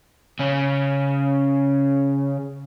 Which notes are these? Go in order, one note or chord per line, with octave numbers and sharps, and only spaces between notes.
C#3 C#4